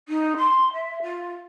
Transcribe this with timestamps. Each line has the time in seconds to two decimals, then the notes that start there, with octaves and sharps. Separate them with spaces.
0.08 D#4
0.37 C6
0.73 E5
1.02 F4